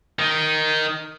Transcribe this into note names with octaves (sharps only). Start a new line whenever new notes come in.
D#3